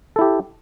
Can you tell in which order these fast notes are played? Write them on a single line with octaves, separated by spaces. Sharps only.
A4 E4 G4